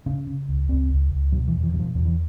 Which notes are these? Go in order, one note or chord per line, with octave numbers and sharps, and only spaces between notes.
C#3 C#4
C#3
C#2
C#2 C4
C#2
C#2
B2 F#3
E3
E2
E3
B2 F#3
F3
E2 F3
E3